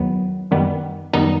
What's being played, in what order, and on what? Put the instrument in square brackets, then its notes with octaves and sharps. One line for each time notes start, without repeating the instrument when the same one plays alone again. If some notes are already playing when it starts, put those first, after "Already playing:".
Already playing: [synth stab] E2 D#3 F#3 B3
F#2 D#3 G3 B3
F#2 D#3 G3 B3 D#4